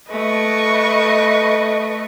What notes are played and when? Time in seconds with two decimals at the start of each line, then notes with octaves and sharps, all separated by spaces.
0.11 A3 B4 D#5 C#6